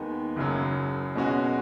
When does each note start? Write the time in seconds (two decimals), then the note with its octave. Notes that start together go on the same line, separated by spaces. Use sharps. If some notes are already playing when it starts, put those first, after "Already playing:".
Already playing: D#2 D#3 G#3 B3
0.36 F#1 F#2 C#3 F#3
1.15 B2 G#3 C#4 F#4